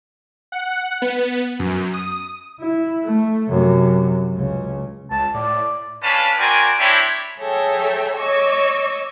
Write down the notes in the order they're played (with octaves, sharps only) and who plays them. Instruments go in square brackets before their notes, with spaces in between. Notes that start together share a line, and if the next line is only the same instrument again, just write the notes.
[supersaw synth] F#5
B3
F#2
D#6
[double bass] E4
A3
F#2 C3
C#2 C#3
[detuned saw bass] C#2 [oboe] A5
[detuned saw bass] A2 [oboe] D5
[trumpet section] C#4 D4 B4 F5 A5
C4 F#4 A#4 D5 G#5
C4 D4 E4 G4 C#5
[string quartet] G#4 A4 C#5 E5 G5 A#5
C#5 D#5 C#6 D6 E6